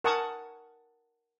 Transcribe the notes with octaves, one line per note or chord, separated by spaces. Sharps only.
A#4 F#5 G#5 A5 C#6 D#6